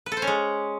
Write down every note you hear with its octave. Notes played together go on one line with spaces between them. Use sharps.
B4
A4
C5
C#4
G#3